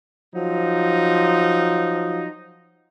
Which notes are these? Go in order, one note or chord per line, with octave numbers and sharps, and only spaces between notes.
F3 F#3 D#4